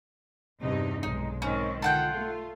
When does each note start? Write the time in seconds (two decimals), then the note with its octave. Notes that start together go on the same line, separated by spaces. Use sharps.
0.61 E2 G2 C3 D#4
1.03 B1 G#3 D#4
1.42 G#2 D#3 C4 C#4
1.82 D3 F4 A4 F#5 G5
2.13 A3